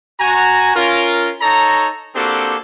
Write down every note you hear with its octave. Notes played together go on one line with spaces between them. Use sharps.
F#4 G#5 A#5
C#4 F4 A#4
D#4 A4 C#5 A#5
A#3 C4 D4 F#4 G4 A4